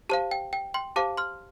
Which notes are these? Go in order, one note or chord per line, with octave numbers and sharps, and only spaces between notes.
G4 C5 F5 A5
G5
G5
G5 C6
G4 C5 F5 A5 D6
C6 F6